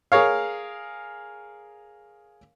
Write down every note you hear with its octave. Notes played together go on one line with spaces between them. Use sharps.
G#4 A#4 C#5 F5